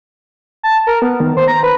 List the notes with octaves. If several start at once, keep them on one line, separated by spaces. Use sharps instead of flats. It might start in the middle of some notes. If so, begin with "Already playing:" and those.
A5
A#4
B3
D#3
C5
A#5
B4